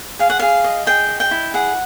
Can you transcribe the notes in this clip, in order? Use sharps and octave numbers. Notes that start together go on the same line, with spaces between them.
G#4 F5
F#5
G#4 F5
D#5
G#4 G5
D#5
G5
E4
G#4 F#5